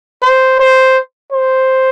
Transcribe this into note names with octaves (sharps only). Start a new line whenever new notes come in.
C5
C5
C5